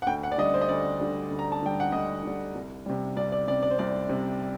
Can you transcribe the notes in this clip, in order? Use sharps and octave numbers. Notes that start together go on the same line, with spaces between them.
F#5
D2 G5
F#5
D5
D3 G3 D#5
C5
D#5
D2 D5
D3 G3
D2
A#5
A5
D3 G3 G5
F#5
D2 D#5
D3 G3
C2
C3 G3
C2 D5
D5
C3 G3 D5
D5
C5
C2 D5
C3 G3